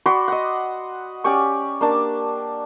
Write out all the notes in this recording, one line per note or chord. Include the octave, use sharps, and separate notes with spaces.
F#4 D5 B5 C6
D#5 F#5
C#4 G4 D5 C#6
A#3 D4 A5